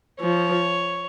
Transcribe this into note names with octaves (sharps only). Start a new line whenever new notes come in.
F3 C#5